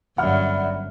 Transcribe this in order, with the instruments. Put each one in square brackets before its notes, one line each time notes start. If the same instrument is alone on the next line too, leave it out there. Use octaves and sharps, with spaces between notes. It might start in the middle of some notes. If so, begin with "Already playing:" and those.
[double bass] G1 [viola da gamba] F#2 [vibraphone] D5 E5 B5 [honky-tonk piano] F#5 F6